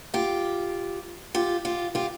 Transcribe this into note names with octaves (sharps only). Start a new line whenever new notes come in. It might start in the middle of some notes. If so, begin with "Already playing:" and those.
F4 G4
F4 G4
F4 G4
F4 G4